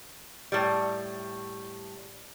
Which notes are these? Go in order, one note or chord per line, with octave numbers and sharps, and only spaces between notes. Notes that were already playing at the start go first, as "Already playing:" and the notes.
A2 G3